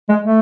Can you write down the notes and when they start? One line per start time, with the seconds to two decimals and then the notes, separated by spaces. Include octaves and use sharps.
0.09 G#3
0.25 A3